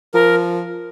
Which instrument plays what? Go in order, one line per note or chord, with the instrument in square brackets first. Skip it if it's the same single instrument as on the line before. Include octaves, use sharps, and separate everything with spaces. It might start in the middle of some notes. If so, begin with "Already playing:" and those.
[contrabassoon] F3 [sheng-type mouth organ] A#4